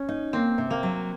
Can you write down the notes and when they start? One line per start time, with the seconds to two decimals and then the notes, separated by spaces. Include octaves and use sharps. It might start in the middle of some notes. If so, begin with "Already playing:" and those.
Already playing: C#4
0.09 D#4
0.33 A#3 C4
0.58 C3
0.70 A#3
0.83 F#3